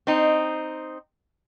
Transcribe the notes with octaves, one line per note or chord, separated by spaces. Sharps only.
C4 D#4